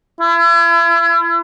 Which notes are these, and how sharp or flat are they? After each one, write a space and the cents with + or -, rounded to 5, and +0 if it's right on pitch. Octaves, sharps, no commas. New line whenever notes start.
E4 +40